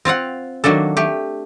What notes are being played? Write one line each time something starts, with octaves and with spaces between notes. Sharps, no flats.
C4 F4 F5 F#5
D#3 F#3 A#3 D4 A4
A3 G4